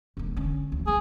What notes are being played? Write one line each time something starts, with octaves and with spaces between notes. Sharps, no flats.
E1 A#3
D3 C#4
D2
F#3 C4 G#4